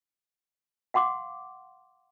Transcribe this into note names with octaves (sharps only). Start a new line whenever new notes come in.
F5 F#5 C6 D6